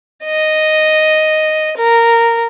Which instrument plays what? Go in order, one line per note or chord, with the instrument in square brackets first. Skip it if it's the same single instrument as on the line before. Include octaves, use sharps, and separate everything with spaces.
[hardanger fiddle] D#5
A#4